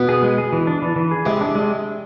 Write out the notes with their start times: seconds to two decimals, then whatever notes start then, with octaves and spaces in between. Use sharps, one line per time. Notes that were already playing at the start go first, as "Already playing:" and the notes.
Already playing: B2 B3
0.09 G#4
0.23 G#3
0.38 G#4
0.53 E3
0.67 D4
0.82 E3
0.96 E3
1.11 G#4
1.25 C3 G#3 C4
1.41 D4
1.55 G#3